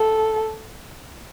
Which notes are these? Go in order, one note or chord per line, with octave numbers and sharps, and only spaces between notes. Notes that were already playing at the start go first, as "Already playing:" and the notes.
Already playing: A4